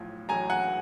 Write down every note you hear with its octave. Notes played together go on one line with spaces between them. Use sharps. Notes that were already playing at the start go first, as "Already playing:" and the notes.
Already playing: B1 A2 F3
A1 A2 F#3 G#5 A#5
F#5 G#5